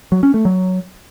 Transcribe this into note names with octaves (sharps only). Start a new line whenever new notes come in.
F#3
C#4
A3
F#3